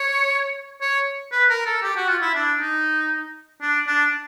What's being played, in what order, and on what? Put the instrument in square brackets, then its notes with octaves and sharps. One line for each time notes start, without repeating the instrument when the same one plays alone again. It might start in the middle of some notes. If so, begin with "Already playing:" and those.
Already playing: [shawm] C#5
C#5
B4
A#4
A4
G4
F#4
F4
E4
D4
D#4
D4
D4